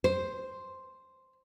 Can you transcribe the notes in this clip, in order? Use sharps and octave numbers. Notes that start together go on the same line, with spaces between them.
C5